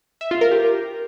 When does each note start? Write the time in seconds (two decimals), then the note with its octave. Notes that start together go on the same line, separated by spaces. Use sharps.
0.21 E5
0.31 F4
0.41 A#4
0.51 G4